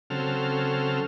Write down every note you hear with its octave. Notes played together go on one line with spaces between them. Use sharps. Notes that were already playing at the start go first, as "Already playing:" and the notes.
C#3 F#3 C4 A4 F6